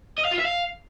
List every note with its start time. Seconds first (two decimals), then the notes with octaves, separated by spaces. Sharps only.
0.18 D#5
0.25 F5
0.32 F4
0.38 E5
0.45 F5